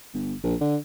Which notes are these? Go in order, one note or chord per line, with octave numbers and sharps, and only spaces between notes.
G1
A#1
D3